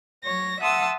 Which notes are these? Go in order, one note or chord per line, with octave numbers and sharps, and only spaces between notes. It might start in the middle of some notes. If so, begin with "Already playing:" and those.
F#3 C#5 A#6
E5 F#5 A5 C6 D#6 E6